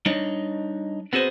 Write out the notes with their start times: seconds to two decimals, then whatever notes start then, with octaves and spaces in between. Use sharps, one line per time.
0.06 G3 D4 D#4 C#5 D#5
1.13 B3 C4 F#4 G#4 C5